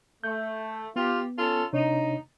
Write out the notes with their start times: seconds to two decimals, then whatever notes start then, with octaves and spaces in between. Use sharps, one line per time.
0.24 A3 G6
0.96 B3 F4 G4
1.39 C#4 F4 A4
1.73 C3 D4 D#4 C#5